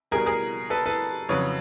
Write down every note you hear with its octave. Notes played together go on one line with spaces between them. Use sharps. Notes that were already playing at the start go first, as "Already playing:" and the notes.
B2 G3 G#4 A#4
G#4 A#4
A4 B4
A4 B4
F2 C#3 F#3 B4 C#5